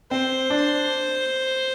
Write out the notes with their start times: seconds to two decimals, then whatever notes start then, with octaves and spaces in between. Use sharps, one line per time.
0.11 C4 C5
0.50 D4